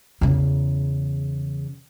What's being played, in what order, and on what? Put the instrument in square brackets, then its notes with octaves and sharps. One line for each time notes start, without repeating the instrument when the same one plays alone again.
[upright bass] E2 C#3